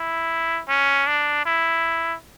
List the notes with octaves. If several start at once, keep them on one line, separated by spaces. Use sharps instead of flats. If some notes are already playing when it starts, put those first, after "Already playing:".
Already playing: E4
C#4
D4
E4